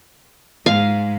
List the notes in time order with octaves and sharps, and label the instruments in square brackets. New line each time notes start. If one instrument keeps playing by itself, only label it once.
[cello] G#2 G#3 [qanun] F5